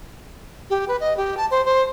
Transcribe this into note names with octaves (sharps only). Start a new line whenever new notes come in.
G4
B4
D#5
G4
A5
C5
C5